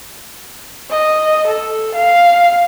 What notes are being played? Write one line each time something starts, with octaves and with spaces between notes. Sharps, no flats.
D#5
A4
F5